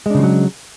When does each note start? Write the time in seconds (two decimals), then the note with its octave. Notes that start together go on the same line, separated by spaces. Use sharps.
0.06 G#3
0.10 D4
0.14 C#3
0.19 F3
0.23 F#3